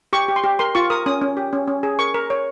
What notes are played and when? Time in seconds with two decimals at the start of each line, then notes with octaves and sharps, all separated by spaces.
0.13 G4 C#6
0.28 G4
0.36 C6
0.44 G4
0.59 A#4 C6
0.75 F4 C#6
0.90 A#4 D#6
1.06 C#4 D#6
1.21 C#4
1.37 G4
1.53 C#4
1.67 C#4
1.83 G#4
1.99 A#4 C#6
2.15 A#4
2.30 C#5